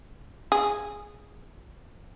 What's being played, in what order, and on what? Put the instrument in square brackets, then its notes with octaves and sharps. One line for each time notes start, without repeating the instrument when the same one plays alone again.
[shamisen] G#4